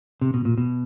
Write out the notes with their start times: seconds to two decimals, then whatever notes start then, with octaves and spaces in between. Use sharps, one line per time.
0.21 C3
0.34 B2
0.45 A#2
0.58 B2